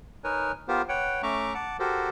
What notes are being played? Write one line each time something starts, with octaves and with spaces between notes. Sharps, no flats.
D#4 A#4 B4 C#5 G#5
B3 F4 G4 A#4 C5
B4 C#5 F#5 G5
A3 C#4 E5 A#5 C#6 D6
F#5 A5 D6
F#4 G4 A4 A#4 C5